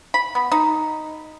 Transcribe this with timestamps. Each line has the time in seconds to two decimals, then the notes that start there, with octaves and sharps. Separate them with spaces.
0.14 B5
0.35 B3
0.52 D#4